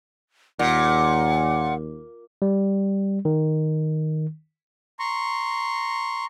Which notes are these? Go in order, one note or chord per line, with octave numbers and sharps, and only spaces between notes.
D#2 A#2 F#5
G3
D#3
A#5 C6 C#6